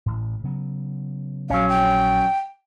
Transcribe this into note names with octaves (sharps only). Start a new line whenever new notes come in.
A1 A2
C#3 F#3 B3
A#1 F#3 C#4 F5
G5